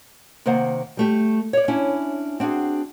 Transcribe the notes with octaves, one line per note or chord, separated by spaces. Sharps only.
C3 D#3 A#3 C5 F#5
G3 A3 G4
C#5 D5
C#4 D4 E4 G#5
C4 D4 F#4 G#4